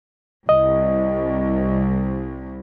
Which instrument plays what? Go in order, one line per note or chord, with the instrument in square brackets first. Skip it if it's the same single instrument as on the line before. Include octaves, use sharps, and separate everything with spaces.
[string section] C2 [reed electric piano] D#5